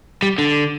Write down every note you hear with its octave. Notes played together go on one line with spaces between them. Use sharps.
G3
D3